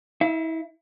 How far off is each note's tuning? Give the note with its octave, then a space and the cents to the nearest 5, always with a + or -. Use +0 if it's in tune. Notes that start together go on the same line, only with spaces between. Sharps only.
E4 -35 E5 +35